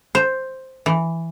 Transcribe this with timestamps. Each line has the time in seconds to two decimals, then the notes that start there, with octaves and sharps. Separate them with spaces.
0.15 C5
0.86 E3